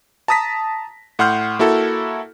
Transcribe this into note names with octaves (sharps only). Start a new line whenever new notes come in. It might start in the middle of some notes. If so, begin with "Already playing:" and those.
A5 A#5 D#6 A#6 B6
A2 F#5 C6 F6 G6
A#3 E4 F#4 A4